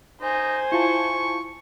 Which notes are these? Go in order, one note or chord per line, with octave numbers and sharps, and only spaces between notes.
D#4 C5 G#5
E4 F4 A5 C#6